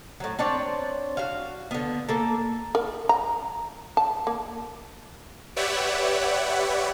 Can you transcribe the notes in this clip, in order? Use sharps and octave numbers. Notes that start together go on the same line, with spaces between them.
A2 F#3
C4 D4 C#5 D5
F#4 F5
D3 B3
A#3 A4
A#4
A#5
A5
A#3
G4 B4 C#5 D5 E5 F#5